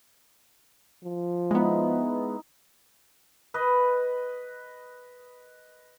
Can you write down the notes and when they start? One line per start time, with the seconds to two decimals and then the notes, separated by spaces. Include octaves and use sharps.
1.04 F3
1.51 G#3 B3 D#4 E4
3.54 B4 D#5